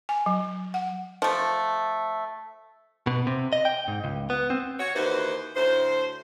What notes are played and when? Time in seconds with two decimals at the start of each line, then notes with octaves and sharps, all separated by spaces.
0.09 G#5
0.26 F#3
0.74 F#5
1.22 F3 A3
3.07 B2
3.27 C3
3.53 D#5
3.65 G5
3.88 G#2
4.04 C#2
4.30 B3
4.50 C4
4.79 F#4 C#5
4.94 D#2 E3 F#4 B4 C5
5.55 D2 A2 C5